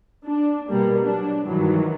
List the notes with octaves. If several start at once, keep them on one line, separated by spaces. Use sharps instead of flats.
D4
B2 G3 A#3
F#3 D4
G2 D#3 E3 F#3